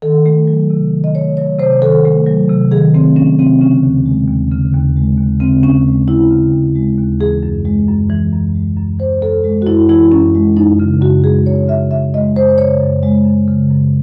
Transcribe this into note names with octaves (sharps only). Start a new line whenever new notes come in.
D#3 A4
A3
F#3
C3
D#3
D#5
A3 C#5
F#3 C#5
C3 C5
D#3 A4
A3
F#3
C3
D#3 G#4
A3 C4
F#3 C#4
C3 C4
C#3 C#4
D#2
G#3
D#2
C#3
D#2
G#3
D#2
C#3 C4
D#2 C#4
G#3
D#2 E4
C#3
D#2
G#3
D#2
E3 G#4
F#2
G#3
F#2
E3
F#2
G#3
F#2
E3 C5
F#2 A4
G#3
F#4
F#2 E4
E3 E4
F#2 C#4
G#3
F#2 D#4
C#3
F#2 F#4
G#3 G#4
F#2 C#5
C#3 E5
F#2 E5
G#3 D#5
F#2 C5
C#3 C#5
F#2
G#3
F#2
C#3
F#2